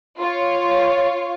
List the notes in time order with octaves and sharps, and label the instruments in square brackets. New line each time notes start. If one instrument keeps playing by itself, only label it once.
[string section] F4 C#5